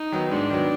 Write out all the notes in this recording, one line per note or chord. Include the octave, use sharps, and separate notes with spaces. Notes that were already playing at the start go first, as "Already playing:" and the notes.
Already playing: D#4
D#3 F#3 B3
G#2 D4
D#3 F#3 B3